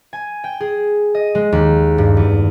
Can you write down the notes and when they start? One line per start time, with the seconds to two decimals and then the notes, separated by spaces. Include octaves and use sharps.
0.13 G#5
0.44 G5
0.60 G#4
1.15 D#5
1.35 G#3
1.52 D#2
1.98 G2
2.17 E2